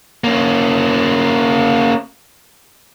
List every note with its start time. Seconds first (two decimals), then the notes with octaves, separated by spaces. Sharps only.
0.24 A#3 C#4